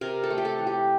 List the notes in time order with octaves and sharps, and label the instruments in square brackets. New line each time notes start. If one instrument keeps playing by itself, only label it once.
[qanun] C3 A#4
A4
A3
G4
A4
E3
G4